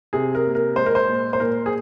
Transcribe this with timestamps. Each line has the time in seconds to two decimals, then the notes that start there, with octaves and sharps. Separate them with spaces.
0.13 C3 G#4
0.35 A#4
0.45 A#3
0.55 A#4
0.76 G#3 C5
0.86 A#4
0.95 C5
1.08 A#2
1.33 C5
1.40 A#2 A#4
1.66 G#4